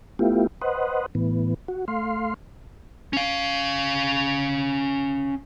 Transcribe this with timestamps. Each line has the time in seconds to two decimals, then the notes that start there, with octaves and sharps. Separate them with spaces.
0.19 A3 B3 E4 F4 G4
0.61 B4 C5 D#5 F#5
1.15 A2 E3 B3
1.68 F#4
1.88 A3 F5 C6
3.13 C#4 F5